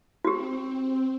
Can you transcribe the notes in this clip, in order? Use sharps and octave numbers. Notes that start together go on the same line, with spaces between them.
C4 F#4 G4